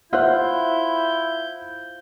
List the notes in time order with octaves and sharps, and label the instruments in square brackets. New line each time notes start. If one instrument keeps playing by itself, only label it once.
[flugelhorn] E4 [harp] F4 C5 [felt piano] E5 F#5 F#6 [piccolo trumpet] G6